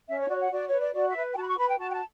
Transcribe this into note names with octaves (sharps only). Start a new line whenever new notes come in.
C#4 E5
C#5
F#4 D5
C#5
F#5
F#4 D5
C#5
B4
D5
F#4 D5
E5
B4
G5
F#4 A5 B5
C#6
B4 B5
G5
F#4 A5
G5
A5